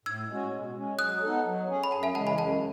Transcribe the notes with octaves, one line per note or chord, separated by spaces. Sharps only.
A2 E6 G#6
G#3 C#4 F#4
B2
G#3 C#4
F#3 D#6 F#6
B3 D#4 A4
F#3
C#4 G#4
B5
F#2 F#5 A5
E5 G#5
C#3 E3 G#3 F#5 A5
G#5 B5
F#2 F#5 A5